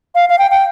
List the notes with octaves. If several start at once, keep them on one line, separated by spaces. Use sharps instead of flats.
F5
F5
G5
G5